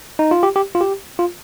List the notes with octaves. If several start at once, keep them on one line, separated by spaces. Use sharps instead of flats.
D#4
F4
G4
G4
F4
G4
F4